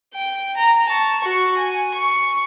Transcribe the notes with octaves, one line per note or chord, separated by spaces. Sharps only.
G5
A#5
A5 C#6
F#4 C#6
G#5
C#6